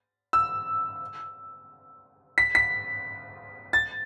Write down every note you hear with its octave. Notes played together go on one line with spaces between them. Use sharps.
E6
B6
B6
A6